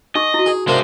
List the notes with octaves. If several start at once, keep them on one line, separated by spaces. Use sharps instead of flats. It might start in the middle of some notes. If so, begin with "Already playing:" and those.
D#4 G#4 D#5 C#6
E4 F#4
G#4
C3 G#3 A#3 D4 C5